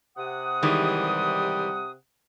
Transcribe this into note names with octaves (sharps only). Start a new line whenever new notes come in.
C3 F#5 D#6
D#3 E3 G3 G#3